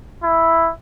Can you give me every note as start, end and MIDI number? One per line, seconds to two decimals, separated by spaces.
0.23 0.70 64